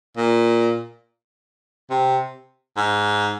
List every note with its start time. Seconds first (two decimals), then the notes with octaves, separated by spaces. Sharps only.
0.17 A#2
1.91 C3
2.77 G#2